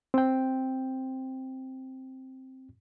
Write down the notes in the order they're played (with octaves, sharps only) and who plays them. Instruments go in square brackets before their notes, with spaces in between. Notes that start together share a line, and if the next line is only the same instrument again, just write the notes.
[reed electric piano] C4 G5